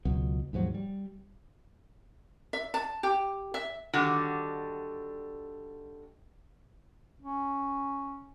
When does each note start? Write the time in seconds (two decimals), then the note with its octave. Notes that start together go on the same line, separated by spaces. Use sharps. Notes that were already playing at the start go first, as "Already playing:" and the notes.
0.05 C#2 B2 F#3
0.53 D#2 G#2 F3 F#3
0.74 G3
2.53 E5
2.74 A5
3.03 G4
3.54 E5
3.93 D3 D#3 G3 F#4
7.22 C#4